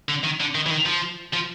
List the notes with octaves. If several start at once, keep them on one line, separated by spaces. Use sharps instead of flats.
D3
D#3
D3
D#3
E3
D#3
F3
F3